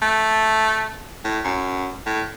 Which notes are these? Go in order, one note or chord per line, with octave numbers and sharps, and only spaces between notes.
A3
A2
F#2
A2